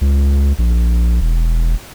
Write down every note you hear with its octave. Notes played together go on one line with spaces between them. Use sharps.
C#2
A#1
E1